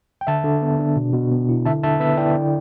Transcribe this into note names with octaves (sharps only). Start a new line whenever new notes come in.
G5
D3 E5 A5
D3
B3
D4
B2
B2
B3
E4
D3 E5 A5
D3 E5 A5
B3 B4 E5
E4 D5 G5
D3